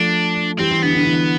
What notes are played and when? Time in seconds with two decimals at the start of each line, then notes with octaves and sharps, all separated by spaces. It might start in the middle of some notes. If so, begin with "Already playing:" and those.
Already playing: F3 A3 D4
0.58 E3 G3 C4
0.71 E3
0.82 D3 B3
0.94 D3
1.05 E3